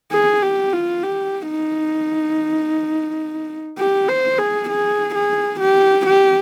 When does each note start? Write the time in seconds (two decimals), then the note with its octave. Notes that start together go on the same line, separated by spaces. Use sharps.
0.12 G#4
0.42 G4
0.73 F4
1.04 G4
1.49 D#4
3.78 G4
4.08 C5
4.39 G#4
4.69 G#4
5.15 G#4
5.61 G4
6.07 G4